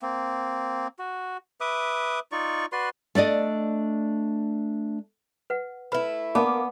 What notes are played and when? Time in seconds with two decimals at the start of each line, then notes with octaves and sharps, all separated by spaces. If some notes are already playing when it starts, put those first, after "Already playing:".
0.02 A#3 C4
0.99 F#4
1.61 B4 E5 D6 D#6
2.32 D#4 F4 D5 C#6
2.72 F#4 B4 D5 C6
3.15 A3 D4 D5 D#5
5.50 B4 F#5
5.92 A3 E4 B4 B5
6.35 A#3 B3 D5 A5 B5 D6